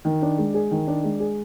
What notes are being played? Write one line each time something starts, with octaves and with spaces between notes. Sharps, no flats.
D#3
D4
G#3
G#4
D#3
D4
G#3
G#4